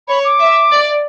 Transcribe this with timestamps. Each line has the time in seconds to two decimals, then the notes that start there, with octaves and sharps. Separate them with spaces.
0.08 C#5 B5
0.25 D6
0.40 E5
0.71 D5